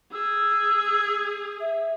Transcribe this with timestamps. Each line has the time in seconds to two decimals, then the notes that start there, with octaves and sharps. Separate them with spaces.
0.12 G#4 E6
1.59 E5